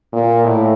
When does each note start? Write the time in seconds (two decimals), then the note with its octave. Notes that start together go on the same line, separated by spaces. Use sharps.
0.13 A#2
0.44 A2